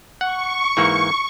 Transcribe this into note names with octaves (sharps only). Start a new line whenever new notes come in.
F#5 C#6
G#2 E3 A#3